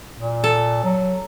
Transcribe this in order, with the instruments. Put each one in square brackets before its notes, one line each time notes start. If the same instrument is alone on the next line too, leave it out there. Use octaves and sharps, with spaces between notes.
[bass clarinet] A#2
[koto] A4
[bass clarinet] F#3